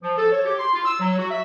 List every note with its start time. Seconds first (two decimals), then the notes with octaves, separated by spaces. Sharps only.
0.02 F3
0.18 A4
0.32 C#5
0.45 G4
0.59 C6
0.73 F4
0.85 E6
1.00 F#3
1.18 F#4
1.31 E5